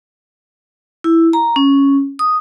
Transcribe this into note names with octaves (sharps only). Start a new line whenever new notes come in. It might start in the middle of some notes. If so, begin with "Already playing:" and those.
E4
A#5
C#4
D#6